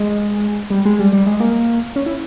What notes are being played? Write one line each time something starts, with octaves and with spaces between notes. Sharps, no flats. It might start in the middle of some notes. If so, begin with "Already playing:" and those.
Already playing: G#3
G3
G#3
G3
G3
G#3
A#3
C#4
E4